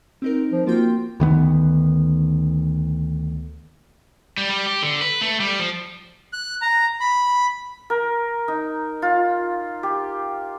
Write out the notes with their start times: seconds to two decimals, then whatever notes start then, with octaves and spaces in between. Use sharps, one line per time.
0.22 C4 D#4 A#4
0.52 F3
0.67 A#3 F4 F#4 G5
1.20 D2 D#3 B3
4.38 G3
4.50 G3
4.66 G4
4.83 D3
5.01 B4
5.21 A3
5.40 G3
5.59 F3
6.33 F#6
6.62 A#5
7.00 B5
7.90 A#4
8.48 D#4
9.02 F4
9.83 G4